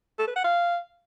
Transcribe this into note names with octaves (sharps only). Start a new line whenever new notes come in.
A4
B4
F#5
F5